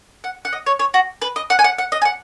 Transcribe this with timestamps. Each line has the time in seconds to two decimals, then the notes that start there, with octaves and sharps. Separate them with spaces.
0.24 F#5
0.45 F#5
0.53 D#5
0.66 C#5
0.79 C#5
0.94 F#4
1.22 B4
1.36 D#5
1.50 F#5
1.59 G#5
1.64 F#5
1.78 F#5
1.92 D#5
2.02 G#5
2.05 F#5